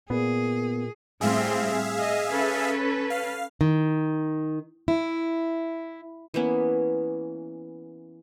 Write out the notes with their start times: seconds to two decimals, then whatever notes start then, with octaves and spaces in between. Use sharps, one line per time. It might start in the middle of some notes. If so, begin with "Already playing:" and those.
0.10 A#2 B3 G#4
1.21 A2 G3 C4 G#4 E5 F5
1.98 D#5
2.31 C#4 A4 B4
3.10 F5
3.61 D#3
4.88 E4
6.34 E3 A#3 B3 C#4